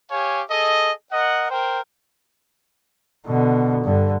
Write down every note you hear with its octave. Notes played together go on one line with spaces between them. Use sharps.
G4 C#5 F5 G#5
G#4 A4 D#5
A#4 D#5 F#5
A#4 C5 G5
B2 D3
G2 D3